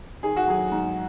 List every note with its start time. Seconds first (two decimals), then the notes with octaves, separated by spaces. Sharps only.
0.23 D#3 G#4
0.36 F#4
0.48 F#3 G#4
0.72 G#2